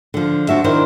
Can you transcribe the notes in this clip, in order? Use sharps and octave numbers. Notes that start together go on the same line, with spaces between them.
D3 F3
F3 D4 F#4 E5
D#3 D4 E4 A#4 C5